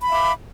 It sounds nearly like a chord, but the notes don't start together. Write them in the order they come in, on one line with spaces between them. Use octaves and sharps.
B5 F5 E5 D6